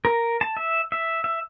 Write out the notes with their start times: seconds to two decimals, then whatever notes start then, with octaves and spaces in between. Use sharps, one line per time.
0.05 A#4
0.41 A5
0.57 E5
0.92 E5
1.24 E5